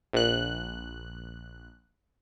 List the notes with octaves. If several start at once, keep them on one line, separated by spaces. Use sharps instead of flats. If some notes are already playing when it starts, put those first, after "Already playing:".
A#1 F#6